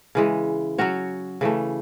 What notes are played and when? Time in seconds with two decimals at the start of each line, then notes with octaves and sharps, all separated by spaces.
0.15 C#3 E3 G#3
0.78 F#3 C#4 F#4 C#5
1.41 C#3 E3 A3